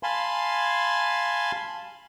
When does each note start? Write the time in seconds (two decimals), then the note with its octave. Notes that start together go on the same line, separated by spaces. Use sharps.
0.03 F5 G#5 A5 B5 C6